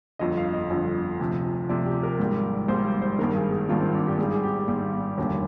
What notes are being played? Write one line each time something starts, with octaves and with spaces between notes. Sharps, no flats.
G1 F2 D3 D#5
F5
D#5
G1 F2 D3
D2 C3 F3
D2 C3 F3 D5
G4
A#4
G#1 G#2 G3
G#1 G#2 G3 C5
C5
G#1 G2 D#3 A#4
G#4
G#4
G#1 G2 D#3 F4
C4
D4
G4
G#1 G#2 G3 G#4
G#4
G4
G#1 G#2 G3
F1 D#2 D3 G3